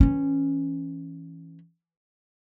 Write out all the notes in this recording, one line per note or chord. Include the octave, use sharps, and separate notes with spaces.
E3 C#4